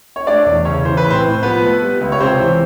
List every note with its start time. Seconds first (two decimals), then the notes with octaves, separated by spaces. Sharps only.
0.16 C#5
0.26 A3 D4 D5
0.46 E2
0.65 C#3 C#4 C#5
0.85 E3 C5
0.97 B4
1.04 A2
1.10 C4 C5
1.23 A2
1.43 F3 B3 B4
1.62 A3
1.82 G3
2.01 C#2
2.12 C#5
2.20 C3 C4 C5
2.40 E3